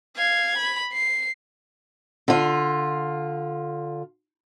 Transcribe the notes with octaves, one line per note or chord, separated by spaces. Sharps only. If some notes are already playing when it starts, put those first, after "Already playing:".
F5 G#6
B5
C7
D3 F4